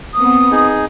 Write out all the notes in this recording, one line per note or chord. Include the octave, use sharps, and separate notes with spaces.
B3 C4 D#6
D#4 G#4